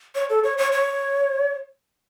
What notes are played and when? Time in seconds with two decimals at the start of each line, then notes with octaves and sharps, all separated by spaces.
0.15 C#5
0.30 A4
0.44 C#5
0.58 C#5
0.72 C#5